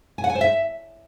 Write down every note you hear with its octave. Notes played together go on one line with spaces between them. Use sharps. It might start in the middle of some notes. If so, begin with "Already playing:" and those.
G#5
F#5
G#5
C5
E5